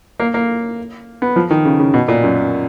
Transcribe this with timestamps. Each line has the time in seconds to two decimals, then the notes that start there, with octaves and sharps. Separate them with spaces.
0.20 A#3
0.34 A#3
1.22 B3
1.36 F3
1.50 D#3
1.65 C#3
1.80 C#3
1.94 B2
2.08 A#2
2.23 F#2